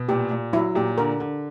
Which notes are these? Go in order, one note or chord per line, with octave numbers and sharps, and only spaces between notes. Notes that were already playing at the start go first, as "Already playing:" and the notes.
Already playing: B2
A#2 G4
A#2
F#3 E4
A#2 G4
D3 A#4
D3